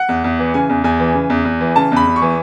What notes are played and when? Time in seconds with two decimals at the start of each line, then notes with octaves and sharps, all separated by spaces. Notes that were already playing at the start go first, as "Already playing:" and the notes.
Already playing: F#5
0.09 E2
0.24 E2
0.39 E3
0.54 C#3 G#5
0.69 E2
0.84 E2 G#5
0.99 E3
1.15 C#3
1.30 E2
1.45 E2
1.60 E3
1.76 C#3 A5
1.92 E2 B5
2.07 E2
2.16 C#6
2.22 E3